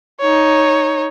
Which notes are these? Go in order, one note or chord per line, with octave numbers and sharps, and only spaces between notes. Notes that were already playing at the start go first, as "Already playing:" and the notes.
D#4 C#5